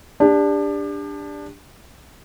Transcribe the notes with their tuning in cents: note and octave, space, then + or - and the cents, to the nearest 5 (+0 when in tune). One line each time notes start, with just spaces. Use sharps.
D4 +0 G4 +35